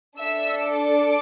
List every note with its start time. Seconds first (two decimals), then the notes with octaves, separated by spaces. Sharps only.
0.18 D4 A4 E5 E6
0.63 D5 D6